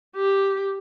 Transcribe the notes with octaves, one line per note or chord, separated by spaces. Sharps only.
G4